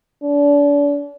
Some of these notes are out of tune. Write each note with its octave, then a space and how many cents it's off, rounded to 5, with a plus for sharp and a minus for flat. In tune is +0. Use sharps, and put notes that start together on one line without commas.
D4 -35